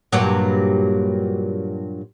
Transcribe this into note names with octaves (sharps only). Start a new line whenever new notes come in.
G2 A#2 F#3